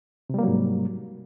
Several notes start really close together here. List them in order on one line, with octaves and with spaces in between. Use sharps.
C3 G3 A#3 F#3 G#2